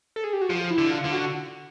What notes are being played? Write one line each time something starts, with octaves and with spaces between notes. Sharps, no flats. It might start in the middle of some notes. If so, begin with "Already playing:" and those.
A4
G#4
G4
F#4
F3 F4
E4
D3
F4
D3
F#4